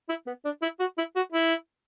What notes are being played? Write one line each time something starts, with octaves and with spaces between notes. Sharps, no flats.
E4
B3
D4
E4
F#4
E4
F#4
E4